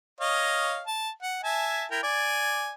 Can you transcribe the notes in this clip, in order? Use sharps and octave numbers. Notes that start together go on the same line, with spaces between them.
C#5 D#5 F5
A5
F#5
E5 G#5 A5
E4 A#4 G5
D5 G#5